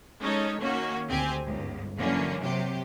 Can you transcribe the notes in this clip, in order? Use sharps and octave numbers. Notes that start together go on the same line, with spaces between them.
G#3 C#4 D#4 A4 C#5
D#3 A#3 C#4 F#4
D2 C4 G4 G#5
G1 C#2 G#2
D3 E3 F#3 A#3 C#4
C3 F#3 G4